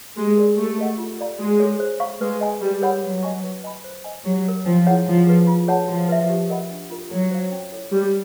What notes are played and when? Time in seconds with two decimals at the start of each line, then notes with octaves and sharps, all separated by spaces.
0.16 G#3 G4
0.38 A#4 D5
0.58 A3 G4
0.78 A#4 D#5 F#5
0.98 F4
1.19 A4 D5 F5 A#5
1.39 G#3 F#4
1.60 A4 C#5
1.80 C5
2.00 F5 A#5 C#6
2.21 G#3 B4
2.41 D#5 G#5
2.61 G3 G4
2.82 A#4 C#5 F#5 B5
3.02 F#3 B4
3.23 D#5 G#5 C#6
3.43 B4
3.64 D#5 G#5 B5
3.84 C5
4.04 D#5 G#5
4.25 F#3 G4
4.45 A#4 C#5
4.66 F3 C#4
4.87 E4 G#4 C#5 F#5
5.07 F3 E4
5.27 G#4 B4
5.47 F4
5.68 G#4 C#5 F#5 A5
5.88 F3 F#4
6.09 B4 E5
6.29 G4
6.49 A#4 D#5 F#5 B5
6.70 D4
6.90 F4 A#4
7.11 F#3 A4
7.31 C5 F5
7.52 C#4
7.72 E4 A4 C#5
7.92 G3 G4